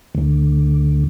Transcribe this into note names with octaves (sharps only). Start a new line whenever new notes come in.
D2